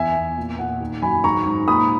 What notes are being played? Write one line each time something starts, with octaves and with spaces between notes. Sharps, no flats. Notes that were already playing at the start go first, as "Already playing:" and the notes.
Already playing: E2 E5 G#5
E2
A#2
A#2 F#5
D#3
F#2 G#5 B5
G#2 A#5 C#6
G#2
A#2 B5 D#6